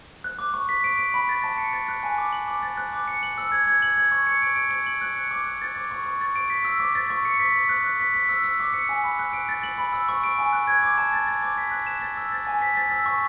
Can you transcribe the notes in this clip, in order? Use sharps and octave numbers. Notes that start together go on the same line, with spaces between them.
F#6
D6
C#6
B6
D7
D7
B5
A6
A5
C#7
A6
F#6
G#5
D6
F#7
D6
A6
F#6
D6
C#7
F#7
E6
G#6
G#6
F#7
G#6
C#6
C#7
D7
D7
D7
F#7
F#6
C#7
D6
F#6
A6
D6
C#6
C#6
A6
D7
B6
E6
D6
A6
C#6
C#7
B6
B6
F#6
F#6
B6
B6
E6
E6
D6
C#7
G#5
B5
F#6
D7
A6
F#7
B5
E6
C#6
D7
G#5
F#6
G#6
D6
A5
A6
A6
D6
B6
F#6
E7
A6
E6
A6
G#5
B6
A6
E6
C#6